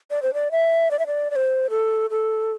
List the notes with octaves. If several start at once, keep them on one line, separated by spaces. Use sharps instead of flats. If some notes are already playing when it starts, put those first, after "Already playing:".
D5
C5
D5
E5
D5
E5
D5
D5
C5
A4
A4